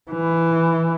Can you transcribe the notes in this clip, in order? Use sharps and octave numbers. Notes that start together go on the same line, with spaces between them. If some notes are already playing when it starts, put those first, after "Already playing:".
E3